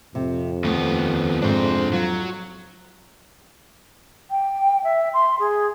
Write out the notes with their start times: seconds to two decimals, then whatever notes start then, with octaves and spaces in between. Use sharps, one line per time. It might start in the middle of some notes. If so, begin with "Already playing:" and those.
0.15 F2 C3
0.64 D#2 A3 B3
1.42 G#2 C3 D4 C5
1.93 F#3 F4
4.30 G5
4.84 E5
5.14 C6
5.40 G#4